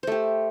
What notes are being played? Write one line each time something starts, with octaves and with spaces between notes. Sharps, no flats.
A3 G4 C5